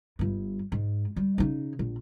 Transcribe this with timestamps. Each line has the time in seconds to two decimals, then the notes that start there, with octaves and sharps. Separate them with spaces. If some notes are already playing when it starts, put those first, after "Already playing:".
0.19 G1 G2
0.72 G#2
1.16 G3
1.38 C#3 D#4
1.79 A#1